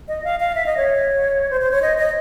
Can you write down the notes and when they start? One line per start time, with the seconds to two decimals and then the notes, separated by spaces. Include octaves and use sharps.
0.08 D#5
0.24 F5
0.40 F5
0.55 E5
0.66 D#5
0.77 C#5
1.51 C5
1.61 C5
1.71 C#5
1.82 D#5
1.98 D#5